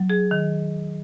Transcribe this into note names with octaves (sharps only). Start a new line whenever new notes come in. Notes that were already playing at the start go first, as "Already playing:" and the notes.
Already playing: F#3
G#4
D#3